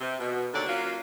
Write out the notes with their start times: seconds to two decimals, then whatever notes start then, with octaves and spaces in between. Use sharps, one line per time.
0.01 C3
0.20 B2
0.53 D#2 D3 C#5 D5
0.67 F#3 A#3 C#4 F4